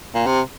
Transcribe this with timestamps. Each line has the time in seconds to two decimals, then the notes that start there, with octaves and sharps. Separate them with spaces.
0.14 A#2
0.26 C3